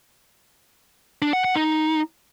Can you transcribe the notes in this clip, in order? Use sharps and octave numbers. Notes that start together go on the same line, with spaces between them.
D4
F#5
F#5
D#4